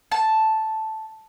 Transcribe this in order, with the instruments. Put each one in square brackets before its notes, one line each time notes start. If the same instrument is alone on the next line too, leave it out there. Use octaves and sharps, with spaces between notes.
[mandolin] A5